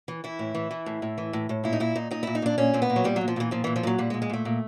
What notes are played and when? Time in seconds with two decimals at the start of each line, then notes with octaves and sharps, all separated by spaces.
0.08 E3
0.24 E3 E4
0.39 A2
0.54 E3
0.71 E3
0.86 A2
1.02 A2
1.18 E3
1.33 A2
1.49 A2
1.64 A#2 E4
1.73 D#4
1.80 A#2 E4
1.95 A#2 D#4
2.11 A#2 D#4
2.23 A#2 E4
2.35 D#4
2.42 A#2 D4
2.58 A#2 C#4
2.74 A#2 C4
2.82 B3
2.90 A#2
2.96 F#3
3.04 A#2 G3
3.16 F#3
3.21 A#2
3.28 F3
3.36 A#2 E3
3.51 A#2 F3
3.64 A#2 E3
3.76 F3
3.83 A#2 F#3
3.98 A#2 G3
4.10 G#3
4.14 A#2
4.22 G#3
4.30 A#2 A3
4.45 A#2